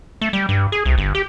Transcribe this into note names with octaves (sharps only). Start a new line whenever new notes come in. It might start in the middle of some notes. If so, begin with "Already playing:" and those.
A3
G3
G2
G#4
C2
G1
G4